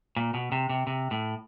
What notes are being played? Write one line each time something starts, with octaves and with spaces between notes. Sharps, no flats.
A#2
B2
C3
C3
C3
A2